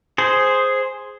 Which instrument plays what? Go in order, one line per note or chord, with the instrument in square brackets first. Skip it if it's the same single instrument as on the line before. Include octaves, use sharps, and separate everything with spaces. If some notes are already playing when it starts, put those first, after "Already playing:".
[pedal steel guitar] G#4 C5